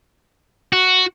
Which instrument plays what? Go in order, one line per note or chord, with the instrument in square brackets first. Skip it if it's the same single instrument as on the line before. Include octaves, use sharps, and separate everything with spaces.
[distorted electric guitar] F#4